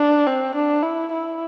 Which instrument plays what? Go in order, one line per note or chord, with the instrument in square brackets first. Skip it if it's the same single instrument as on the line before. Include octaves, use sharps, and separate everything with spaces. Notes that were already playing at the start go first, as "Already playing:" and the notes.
Already playing: [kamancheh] D4
C4
D4
E4
E4